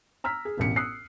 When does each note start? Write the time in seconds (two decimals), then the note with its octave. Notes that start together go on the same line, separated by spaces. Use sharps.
0.24 A#5 E6 F6 B6
0.45 G#4
0.57 E1 A1 C#7
0.76 D#6 E6 F#6 C7